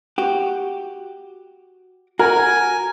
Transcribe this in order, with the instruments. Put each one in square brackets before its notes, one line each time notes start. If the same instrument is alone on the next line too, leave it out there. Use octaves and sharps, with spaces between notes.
[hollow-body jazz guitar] F#4 G4
[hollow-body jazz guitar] F#4 [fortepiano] A#4 [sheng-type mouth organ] G#5